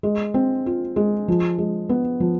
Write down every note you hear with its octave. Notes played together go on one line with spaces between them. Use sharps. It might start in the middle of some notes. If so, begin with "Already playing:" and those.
G#3
C4
F4
G#3
F3
G#3
B3
F3